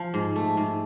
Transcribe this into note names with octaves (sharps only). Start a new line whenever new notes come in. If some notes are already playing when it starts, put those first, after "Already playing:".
Already playing: F3
G#2
A3
G#2